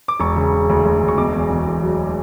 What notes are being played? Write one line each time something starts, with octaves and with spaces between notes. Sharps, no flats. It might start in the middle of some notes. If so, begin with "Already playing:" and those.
D6
E1 C#6
C#3
C#3
D2
D2
E1
C#6
B2 D6
E2
B2
E2
F#3